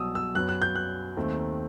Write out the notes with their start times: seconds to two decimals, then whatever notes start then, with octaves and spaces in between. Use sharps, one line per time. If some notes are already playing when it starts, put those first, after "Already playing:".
Already playing: C2 B2 F#3 D#6 E6
0.15 E6
0.35 F#2 F#3 B3 F#6
0.49 F#6
0.62 G6
0.75 F#6
1.17 D#2 D#3 A3 C4